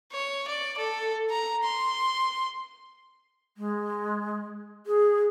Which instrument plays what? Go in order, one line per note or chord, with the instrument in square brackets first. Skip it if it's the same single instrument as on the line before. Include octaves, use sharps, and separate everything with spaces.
[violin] C#5
D5
A4
A#5
C6
[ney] G#3
G#4